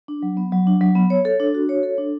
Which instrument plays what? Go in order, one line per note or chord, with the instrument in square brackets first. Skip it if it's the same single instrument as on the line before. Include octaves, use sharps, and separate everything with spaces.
[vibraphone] D4
F#3
B3
F#3
D4
F#3
B3
C#5
A4
D4
F#4
C#5
A4
D4